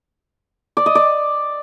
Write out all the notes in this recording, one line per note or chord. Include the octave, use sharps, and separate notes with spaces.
D5
D#5
D5